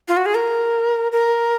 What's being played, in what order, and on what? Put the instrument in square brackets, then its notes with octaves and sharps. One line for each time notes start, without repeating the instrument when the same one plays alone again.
[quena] F4
F#4
G#4
A#4
A#4